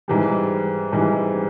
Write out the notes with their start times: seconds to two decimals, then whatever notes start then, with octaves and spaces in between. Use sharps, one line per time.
0.08 G#2 E3 G3
0.93 G#2 E3 G3